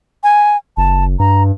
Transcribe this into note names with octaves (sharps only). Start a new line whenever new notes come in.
G#5
F#1 A5
G2 A#5